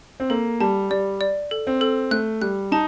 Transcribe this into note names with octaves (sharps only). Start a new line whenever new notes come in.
C4
A#3 A4
G3 A5
G3 D5
D5
A4
C4
A4
A3 F#6
G3 F#6
D#4 A5